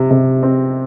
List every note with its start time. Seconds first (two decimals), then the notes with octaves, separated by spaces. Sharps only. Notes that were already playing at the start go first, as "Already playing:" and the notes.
Already playing: C3
0.11 C3
0.43 C4